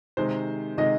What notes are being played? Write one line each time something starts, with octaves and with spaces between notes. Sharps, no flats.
C3 D#3 G#3 C5
C3 D#3 G#3 D#5